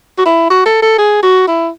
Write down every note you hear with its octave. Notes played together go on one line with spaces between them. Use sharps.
F#4
E4
F#4
A4
A4
G#4
F#4
E4